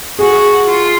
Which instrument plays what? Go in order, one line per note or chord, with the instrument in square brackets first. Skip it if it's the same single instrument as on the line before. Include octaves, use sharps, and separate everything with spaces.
[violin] F#4 [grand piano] G#4
[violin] F4